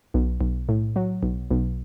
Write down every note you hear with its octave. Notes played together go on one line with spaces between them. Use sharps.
B1
B1
A2
F#3
B1
B1